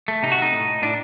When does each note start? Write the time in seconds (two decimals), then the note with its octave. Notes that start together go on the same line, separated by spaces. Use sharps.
0.08 A3
0.23 C3 D#4
0.32 F#4
0.38 A3 D#4
0.53 A2
0.68 A2
0.82 A2 D4